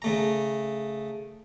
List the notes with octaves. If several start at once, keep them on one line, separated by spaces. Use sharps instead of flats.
C#3 A3 A#5